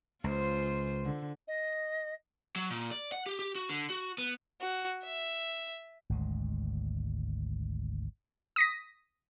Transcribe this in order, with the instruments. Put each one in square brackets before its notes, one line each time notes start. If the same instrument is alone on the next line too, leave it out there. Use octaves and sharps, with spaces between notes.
[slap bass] C#2 [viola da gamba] F4 C5
[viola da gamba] D3
[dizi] D#5
[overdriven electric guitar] F#3
A#2
D5
F#5
G4
G4
F#4
D3
F#4
B3
[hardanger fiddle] F#4
E5
[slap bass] G#1 D2 G#3
[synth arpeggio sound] D#6 A#6 B6